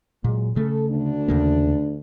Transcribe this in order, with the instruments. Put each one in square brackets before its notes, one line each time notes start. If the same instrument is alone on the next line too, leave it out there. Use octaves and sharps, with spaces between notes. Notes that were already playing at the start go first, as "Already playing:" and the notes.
[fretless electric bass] A#2 [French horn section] F#3 G#3
[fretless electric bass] C#3 A3 [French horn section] A4
[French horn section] D2 D4
[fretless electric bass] D#2 C#3 A#3